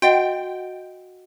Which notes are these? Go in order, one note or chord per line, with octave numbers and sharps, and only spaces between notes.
F#4 D#5 F#5 G5